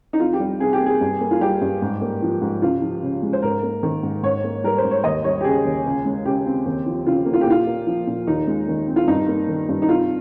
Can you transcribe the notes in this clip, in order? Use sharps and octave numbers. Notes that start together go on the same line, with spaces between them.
D#4
F2 F4
G4
G3
C3 G#4
G4
A#3
G#4
G2
A#3
F4
G3 G4
G2
G#2
A#3
F3
G#2
C#2 F4
F3
C#3
G#3
C5
G#2 A#4
A#3
D#3
G#2
G#2 C#5
A#3
G3 A#4
C5
G#2
C#5
D#2 D#5
G3 C#5
G4
C#3 G#4
D#2
C#2
G#3
C#3 G4
C4
D#2
F3
C#3 F4
A#3
F4
G4
A#2 F4
A#3
F3
A#2
D#2 D#4
G#3
D#3
C4
F4
G2 D#4
A#3
D#3
G2
D#4
C2 F4